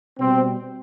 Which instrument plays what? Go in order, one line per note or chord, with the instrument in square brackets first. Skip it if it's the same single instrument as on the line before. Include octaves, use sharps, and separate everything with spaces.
[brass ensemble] B2 G3 C4